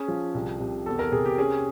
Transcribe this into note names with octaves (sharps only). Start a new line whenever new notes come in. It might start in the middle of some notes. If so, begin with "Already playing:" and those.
Already playing: C#4 G#4
F3
C2
C3
E2 A4
A#4
C3 G#4
G4
C#4 G#4